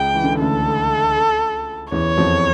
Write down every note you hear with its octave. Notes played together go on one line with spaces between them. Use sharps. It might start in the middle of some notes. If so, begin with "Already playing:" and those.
Already playing: C#2 C#3 G5
E3
D3
C#3
D2 D3 A4
E2 E3 C#5
F2 F3